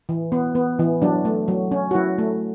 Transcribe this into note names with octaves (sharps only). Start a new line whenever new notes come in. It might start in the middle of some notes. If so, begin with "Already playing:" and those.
E3
B3
B3
E3
F#3 D4
A3
F#3
C#4
F#4
F#3 E4
A3